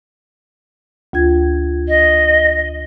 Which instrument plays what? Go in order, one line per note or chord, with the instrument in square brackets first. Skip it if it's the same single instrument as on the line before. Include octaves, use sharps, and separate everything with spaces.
[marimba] D2 F4 G#6
[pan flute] D#5